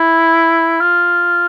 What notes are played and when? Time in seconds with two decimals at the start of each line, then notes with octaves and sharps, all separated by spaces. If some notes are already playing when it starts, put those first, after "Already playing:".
Already playing: E4
0.81 F4